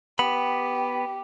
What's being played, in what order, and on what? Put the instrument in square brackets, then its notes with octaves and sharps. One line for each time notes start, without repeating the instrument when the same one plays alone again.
[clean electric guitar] B3 B5 [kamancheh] G4